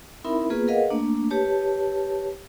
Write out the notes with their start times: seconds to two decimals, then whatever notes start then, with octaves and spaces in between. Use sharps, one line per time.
0.24 C4 D#4 E4 A#4 E5 B5
0.50 A#3 B3 F4 G#4 B4
0.68 G#4 A#4 B4 D#5 F5 F#5
0.90 A3 A#3 D4
1.30 G4 B4 C#5 A5